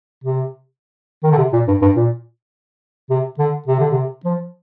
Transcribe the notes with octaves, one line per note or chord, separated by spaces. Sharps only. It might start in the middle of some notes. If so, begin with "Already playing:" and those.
C3
D#3
D3
C3
A#2
G2
G2
A#2
C3
D3
C3
D3
C3
F3